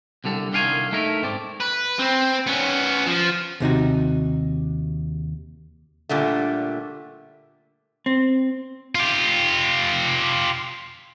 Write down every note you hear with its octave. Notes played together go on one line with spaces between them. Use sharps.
C2 D3 G3 A4
C2 D3 D#3 F5 G5 G#5
A3 D#4 E4 A4 A#4
G#2 C4 D5
B4
C4
B3 C#4
F3
D#2 C3 D#4 F#4
A#2 D3 G3 A3
C4
F4 G4